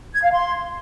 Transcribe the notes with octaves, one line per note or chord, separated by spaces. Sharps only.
G#6
F5
C6